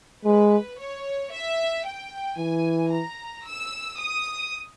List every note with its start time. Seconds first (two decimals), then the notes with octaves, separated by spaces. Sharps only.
0.25 G#3 B4
0.78 C#5
1.31 E5
1.85 G5
2.38 E3 G#5
2.91 A#5
3.45 E6
3.98 D#6